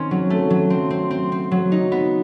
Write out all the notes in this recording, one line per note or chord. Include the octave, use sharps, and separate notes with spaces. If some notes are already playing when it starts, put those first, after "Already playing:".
Already playing: D#3 C4 C#4
F#3
A3
F#3
C4
C4
C4
C4
F#3
D#4
B3